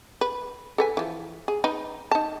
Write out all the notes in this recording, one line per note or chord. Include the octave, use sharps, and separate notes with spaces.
B4
A4 B4 G#5
E3 F3
G#4
D#4 B4
D#4 A5